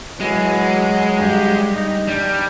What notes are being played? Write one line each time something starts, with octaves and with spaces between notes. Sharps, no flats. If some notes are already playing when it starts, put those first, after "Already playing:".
E3 F#3 G#3
G2 G4
D#4
G3 D4